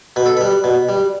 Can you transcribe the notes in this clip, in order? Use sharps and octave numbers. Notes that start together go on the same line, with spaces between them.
B2 B4
A4
G3 B4
B2
G3